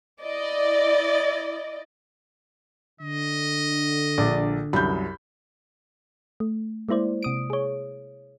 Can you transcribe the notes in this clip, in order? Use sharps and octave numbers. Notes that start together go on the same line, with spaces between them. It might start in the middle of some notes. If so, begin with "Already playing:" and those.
E4 D5 D#5
D3 D#5
A#1 D5
C2 F#2 B5 G6
A3
G#3 A#3 E4 C5 D5
C3 D#6 D7
G#4 C#5